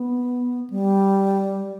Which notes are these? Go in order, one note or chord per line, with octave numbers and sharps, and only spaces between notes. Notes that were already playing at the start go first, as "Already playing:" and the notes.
Already playing: B3
G3